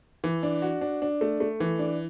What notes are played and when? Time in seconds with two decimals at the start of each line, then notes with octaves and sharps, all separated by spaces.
0.24 E3
0.43 D4
0.62 F#4
0.81 D4
1.02 D4
1.21 A3
1.40 A3
1.60 E3
1.79 D4